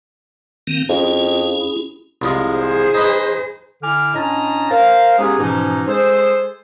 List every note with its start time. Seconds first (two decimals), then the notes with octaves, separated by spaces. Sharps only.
0.67 D#3 A#3 C4
0.89 F2 C#4 E4 G#4
2.22 C2 F3 G#3
2.53 G#4 C5
2.94 D#4 B4 D#5
3.82 D3 E4 G#5 D6 F6
4.15 A2 C#4 D4 D#5 A5 A#5
4.71 A#4 C5 F5
5.18 G#3 B3 C#4 D#4 G4 G#4
5.39 G#2 B2 E3 F3 C#4 D#4
5.87 G#3 G#4 A4 C5